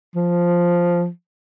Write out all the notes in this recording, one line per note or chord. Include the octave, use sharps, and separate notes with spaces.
F3